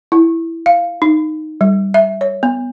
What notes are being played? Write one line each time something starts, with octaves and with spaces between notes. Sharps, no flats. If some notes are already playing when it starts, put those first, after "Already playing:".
E4
F5
D#4
G3
E5
C#5
B3